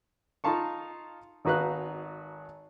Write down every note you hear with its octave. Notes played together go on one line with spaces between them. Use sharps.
D#4 F4 F5 A5 C#6
G#1 D#4 F#4 B4 F5 F#6